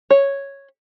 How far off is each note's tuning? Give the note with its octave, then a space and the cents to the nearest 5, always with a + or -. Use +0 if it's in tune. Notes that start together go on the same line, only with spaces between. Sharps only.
C#5 -5